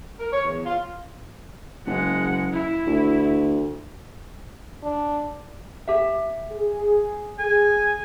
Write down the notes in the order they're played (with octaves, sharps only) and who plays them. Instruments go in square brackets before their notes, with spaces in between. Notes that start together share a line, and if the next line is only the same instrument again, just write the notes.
[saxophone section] A#4
C#5
E2
F4
[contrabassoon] F#1 [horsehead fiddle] G#3 F#5
[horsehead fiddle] E4
[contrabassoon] D2
[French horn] D4
[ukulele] G4 E5
[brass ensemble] G#4
[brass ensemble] G#4 [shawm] G#5